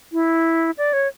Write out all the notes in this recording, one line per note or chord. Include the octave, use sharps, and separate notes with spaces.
E4
D5
C#5